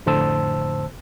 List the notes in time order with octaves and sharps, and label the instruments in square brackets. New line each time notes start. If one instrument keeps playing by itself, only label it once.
[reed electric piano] F2 A2 D3 C5 A5 E6